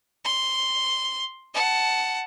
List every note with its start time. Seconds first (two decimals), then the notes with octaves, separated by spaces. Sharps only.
0.25 C6
1.54 F#5 A5